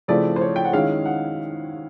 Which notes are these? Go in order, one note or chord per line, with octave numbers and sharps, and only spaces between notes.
C#3 F3 A3 C4 E4 D5
C5
C#5
G5
F#5
D#3 G#3 C#4 E4 F5
F#5